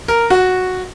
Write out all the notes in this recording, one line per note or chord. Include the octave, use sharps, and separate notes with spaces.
A#4
F#4